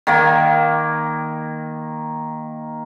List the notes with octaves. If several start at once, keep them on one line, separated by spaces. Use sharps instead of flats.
D#3 A#3